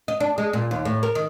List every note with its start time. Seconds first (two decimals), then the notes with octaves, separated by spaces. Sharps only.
0.08 D#5
0.20 D4
0.38 G#3
0.53 A#2
0.71 D#2
0.85 A2
1.03 A#4
1.15 D#3